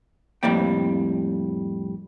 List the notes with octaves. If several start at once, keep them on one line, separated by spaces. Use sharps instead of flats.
F2 A2 G3 A#3 G5